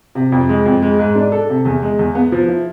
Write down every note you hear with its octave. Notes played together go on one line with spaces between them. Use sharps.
C3
F2
G#3
F2
G#3
G#2
D4
A4
C3
E2
G#3
E2
B3
F3
E4